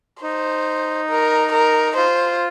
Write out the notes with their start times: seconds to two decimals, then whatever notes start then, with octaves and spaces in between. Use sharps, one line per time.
0.22 D#4 C5
1.10 A#4
1.53 A#4
1.97 F4 C5